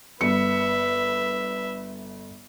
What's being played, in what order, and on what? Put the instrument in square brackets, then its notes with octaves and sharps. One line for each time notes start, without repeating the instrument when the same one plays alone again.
[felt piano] G1 C#7 [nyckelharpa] B4 E5